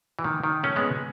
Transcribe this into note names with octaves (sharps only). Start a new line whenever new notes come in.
E3
D#3
D#3
A3 C#4
G#3 B3